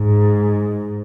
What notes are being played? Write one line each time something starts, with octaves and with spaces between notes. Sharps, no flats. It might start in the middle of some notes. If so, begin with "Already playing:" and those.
Already playing: G#2